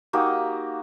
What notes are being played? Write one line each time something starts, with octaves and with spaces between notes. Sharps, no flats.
A#3 D#4 F#4 G4